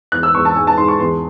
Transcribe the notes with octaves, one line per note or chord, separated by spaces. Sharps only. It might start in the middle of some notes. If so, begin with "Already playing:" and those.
E2 F#6
E6
E2 C#6
A5
G#2 G#5
A5
G#2 C6
C#6
E2 C6